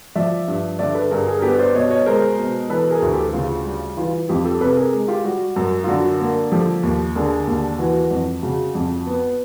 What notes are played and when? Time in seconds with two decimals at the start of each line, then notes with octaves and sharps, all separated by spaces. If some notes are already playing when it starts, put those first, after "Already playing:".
0.16 F3 D5 E5
0.48 G2
0.79 D3 D5 E5
0.95 A4 B4
1.11 G2 G#4 A#4
1.26 G#4 A#4
1.39 A#4
1.42 B3 G4 A4
1.59 C5 D5
1.75 B2 C#5 D#5
1.91 C#5 D#5
2.06 G#3 A#4 C5
2.38 B2
2.70 E3 A4 B4
2.91 G#4 A#4
3.02 D2
3.13 G4 A4
3.33 C#3 F4
3.65 G3
3.97 E3 F4
4.29 F2 F4 G4
4.45 G4 A4
4.61 C3 A4 B4
4.76 G#4 A#4
4.93 G#3
5.08 F4 G4
5.24 G3 F#4
5.56 F#2
5.84 F4
5.88 D3 F#4
6.20 A#3
6.52 F3 G4 A4
6.83 D#2
7.15 D3 G#4 A#4
7.47 D#2
7.79 E3 F#4
8.11 F2
8.43 C#3 F#4
8.75 F2
9.06 B3